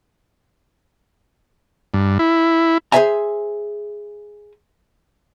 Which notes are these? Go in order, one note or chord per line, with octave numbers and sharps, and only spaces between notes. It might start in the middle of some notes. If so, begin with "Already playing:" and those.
G2
E4
G#4 C5 D5 E5 G#5 A#5